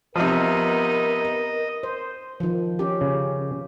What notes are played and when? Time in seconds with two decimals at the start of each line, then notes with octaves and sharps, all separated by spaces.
0.16 C3 F3 B3 D#4 A#4 B4 D#5
1.83 C5
2.40 D#3 F3
2.79 C#4 G4
3.01 C#3